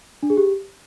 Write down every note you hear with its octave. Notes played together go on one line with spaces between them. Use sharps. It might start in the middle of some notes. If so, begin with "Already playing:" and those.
D4
G#4
G4